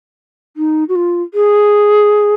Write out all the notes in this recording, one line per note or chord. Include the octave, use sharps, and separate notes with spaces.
D#4
F#4
F4
G#4